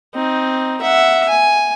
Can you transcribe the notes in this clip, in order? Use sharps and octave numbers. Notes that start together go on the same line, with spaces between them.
C4 D#4
E5 F#5
G#5